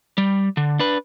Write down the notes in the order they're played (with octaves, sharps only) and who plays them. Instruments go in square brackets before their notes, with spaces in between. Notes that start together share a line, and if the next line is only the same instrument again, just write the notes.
[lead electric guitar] G3
D3
D4 B4